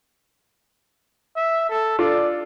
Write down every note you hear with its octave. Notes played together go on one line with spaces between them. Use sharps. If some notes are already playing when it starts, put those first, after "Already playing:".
E5
A4
D4 F4 A4 D5